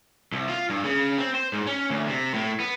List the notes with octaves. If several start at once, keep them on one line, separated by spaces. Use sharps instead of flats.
C2
F4
G2
C#3
C4
C5
G#2
C#4
D2
C3
A2
B3